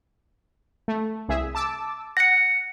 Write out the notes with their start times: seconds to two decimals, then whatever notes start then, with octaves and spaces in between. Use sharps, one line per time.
0.88 A3
1.28 C2 G#4 E5
1.55 A5 D6 E6
2.17 F#5 A#6 C#7